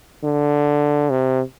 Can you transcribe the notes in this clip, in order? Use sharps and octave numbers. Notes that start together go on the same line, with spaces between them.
D3
C3